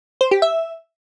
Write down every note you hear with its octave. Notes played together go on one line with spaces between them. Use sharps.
C5
G4
E5